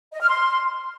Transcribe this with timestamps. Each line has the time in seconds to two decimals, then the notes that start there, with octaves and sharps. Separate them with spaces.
0.14 D#5
0.22 F6
0.30 C6